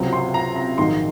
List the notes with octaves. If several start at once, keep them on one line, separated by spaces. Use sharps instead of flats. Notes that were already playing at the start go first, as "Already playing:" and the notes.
Already playing: C#2 C3 F#3 C4
C6
A#5
A#5
A#1 G#2 D#3 F#3 A#3 C6